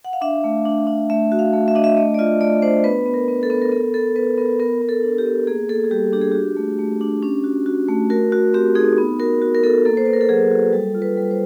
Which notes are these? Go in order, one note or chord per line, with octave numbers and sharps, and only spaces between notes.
F#5
F5
D4 E5
A3
D4
D4
A3 E5
F#4
F5
A3
E5
D4 D#5
E5
A3 D#5
D5
F4 D#5
A3 D5
D4 C5
B3 B4
B3
A#4
B3
A4
B3
A#4
B3 A4
B3 A4
B3 B4
B3 A#4
B3 A#4
B3
A4
D4
G4
B3
A#3 G#4
A#3 A4
G#4
G3 G4
D4 G4
G#4
F#4 G4
A3
A3
D4
C#4
F#4
F#4
A3
F#4 A#4
F#4
C4 G4
D#4 G#4
B3
F#4 A#4
F#4
A#4
B3 A4
A#3 A4
C5
A#3 B4
A#4
A4
F#3 G#4
F#4
G3 A4
F4
B4
G3
C5